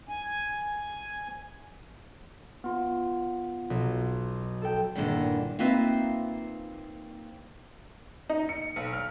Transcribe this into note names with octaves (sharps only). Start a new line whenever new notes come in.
G#5
B3 F4
B1
A4 G5
E2 G2 A#2 D3 D#3
A#3 C4 D#4 F4 B4 E5
D#4
C#7
B1
F6